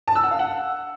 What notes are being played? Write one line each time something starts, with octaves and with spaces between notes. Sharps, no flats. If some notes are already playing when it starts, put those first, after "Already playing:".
A5
E6
F#5
F5
F#5